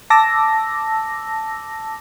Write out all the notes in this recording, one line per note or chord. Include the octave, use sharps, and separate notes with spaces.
A5 D6 E6 A#6